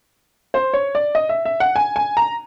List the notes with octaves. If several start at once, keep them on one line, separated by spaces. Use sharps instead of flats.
C5
C#5
D5
D#5
E5
E5
F#5
G#5
G#5
A#5